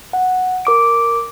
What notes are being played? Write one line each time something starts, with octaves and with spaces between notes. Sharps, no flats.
F#5
A#4 D6 D7